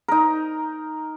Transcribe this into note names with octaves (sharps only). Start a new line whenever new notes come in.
D#4 A#4